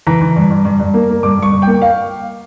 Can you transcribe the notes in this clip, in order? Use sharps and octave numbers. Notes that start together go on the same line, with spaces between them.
E3 A#5
E3
G2
G2
G2
G2
A#3
A#3
G2 D6
G2
C#6
G2
G5
A#3
F5